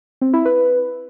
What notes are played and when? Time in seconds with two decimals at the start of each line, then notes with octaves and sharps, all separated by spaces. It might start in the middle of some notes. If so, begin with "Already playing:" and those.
0.21 C4
0.33 E4
0.45 B4